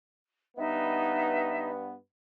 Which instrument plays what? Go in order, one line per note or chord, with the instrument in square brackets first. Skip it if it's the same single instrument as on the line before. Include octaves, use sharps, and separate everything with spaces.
[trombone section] G2 B3 [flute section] D#4 D#5 E5